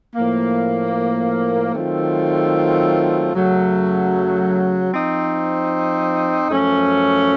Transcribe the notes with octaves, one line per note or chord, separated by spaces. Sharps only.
A2 F3 A#3
D#3 F#3 A3 C4 F4
F#2 C#3 F#3 A3
F3 C4 D#4
F#2 F3 A3 C#4